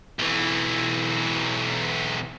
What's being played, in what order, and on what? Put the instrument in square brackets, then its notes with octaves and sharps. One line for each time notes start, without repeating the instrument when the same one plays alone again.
[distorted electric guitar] B1 E3